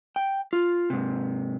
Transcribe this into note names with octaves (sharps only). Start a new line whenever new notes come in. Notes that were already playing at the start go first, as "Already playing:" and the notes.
G5
F4
G#2 C3